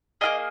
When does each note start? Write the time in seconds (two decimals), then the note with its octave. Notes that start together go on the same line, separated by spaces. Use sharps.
0.21 A#3 F4 G#4 D#5